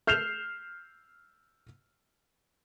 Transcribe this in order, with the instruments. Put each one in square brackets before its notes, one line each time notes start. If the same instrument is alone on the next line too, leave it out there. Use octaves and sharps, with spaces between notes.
[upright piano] F6 G6 C7 E7 F7